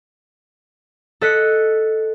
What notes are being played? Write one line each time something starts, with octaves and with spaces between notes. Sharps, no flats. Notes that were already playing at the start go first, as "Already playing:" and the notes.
A4 D#5 F#6 B6 C#7